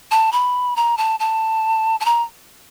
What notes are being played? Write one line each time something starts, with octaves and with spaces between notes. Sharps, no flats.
A5
B5
A#5
A5
A5
A5
A#5